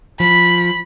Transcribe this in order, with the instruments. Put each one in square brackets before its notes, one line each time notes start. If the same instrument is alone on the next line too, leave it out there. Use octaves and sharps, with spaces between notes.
[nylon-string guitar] F3 [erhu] B5